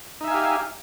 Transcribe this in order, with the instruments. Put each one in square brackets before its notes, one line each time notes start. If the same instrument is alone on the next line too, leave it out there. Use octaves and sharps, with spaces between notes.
[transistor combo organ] D#4
E5
G#5
F5
G4